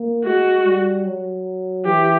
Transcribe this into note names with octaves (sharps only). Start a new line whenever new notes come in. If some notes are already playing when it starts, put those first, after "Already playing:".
Already playing: A#3
G#3 F#4
G3
F#3
E3 G4